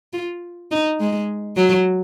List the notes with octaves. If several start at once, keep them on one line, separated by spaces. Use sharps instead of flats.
F4
D#4
G#3
F#3